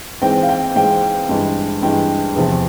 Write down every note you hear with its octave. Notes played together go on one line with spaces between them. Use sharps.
G#2 E3 G#3 C4 G5
F5
G5
G#2 E3 G#3 C4 G5
G2 E3 G#3
G2 E3 G#3 G5
E2 C3 F3